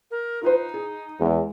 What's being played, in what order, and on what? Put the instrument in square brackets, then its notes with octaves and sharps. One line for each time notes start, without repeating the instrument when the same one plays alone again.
[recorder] A#4
[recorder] D#4 [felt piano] F4 B4 C5
[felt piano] G#4
[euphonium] E2 [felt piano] G#3